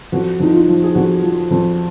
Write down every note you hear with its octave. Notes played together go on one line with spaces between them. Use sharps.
F2 F#4
F2 D#4
F4
F3
G#4
F2 F#4
F3
F2